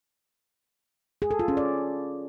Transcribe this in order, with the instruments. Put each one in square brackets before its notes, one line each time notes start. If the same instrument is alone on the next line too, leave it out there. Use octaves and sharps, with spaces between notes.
[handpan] G#4
A4
F4
C#4
D5